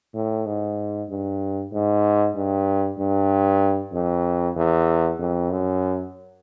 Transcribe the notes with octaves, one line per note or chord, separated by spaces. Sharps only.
A2
G#2
G2
G#2
G2
G2
F2
E2
F2
F#2